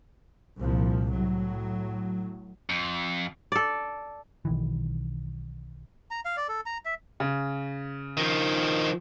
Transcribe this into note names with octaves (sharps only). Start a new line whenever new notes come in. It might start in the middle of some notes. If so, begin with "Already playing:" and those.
C2 A#2 F3
A2 F#3
F2
A4 D5
B1 D#3 E3
A#5
F5
D5
A4
A#5
E5
C#3
D#3 F3